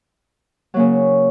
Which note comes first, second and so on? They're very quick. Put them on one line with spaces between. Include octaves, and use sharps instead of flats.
F#3 A#3 C#3